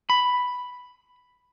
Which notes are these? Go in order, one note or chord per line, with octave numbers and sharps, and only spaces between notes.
B5